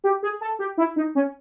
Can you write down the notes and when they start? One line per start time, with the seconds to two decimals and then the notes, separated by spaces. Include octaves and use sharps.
0.04 G4
0.23 G#4
0.41 A4
0.59 G4
0.78 E4
0.96 D#4
1.15 C#4